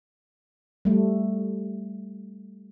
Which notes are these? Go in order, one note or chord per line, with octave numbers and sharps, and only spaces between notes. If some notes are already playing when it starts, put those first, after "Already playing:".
G3 A3